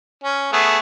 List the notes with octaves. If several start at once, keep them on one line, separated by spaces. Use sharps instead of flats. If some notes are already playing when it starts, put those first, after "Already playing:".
C#4
A3 B3 G#4